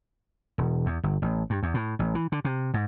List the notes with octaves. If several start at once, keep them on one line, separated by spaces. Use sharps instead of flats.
E1
E2
G1
A1
G2
E2
A2
A1
E3
D3
C3
G#2